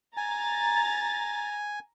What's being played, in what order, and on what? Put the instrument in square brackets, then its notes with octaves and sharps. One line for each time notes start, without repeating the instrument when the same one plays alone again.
[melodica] G#5 [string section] A#5 A6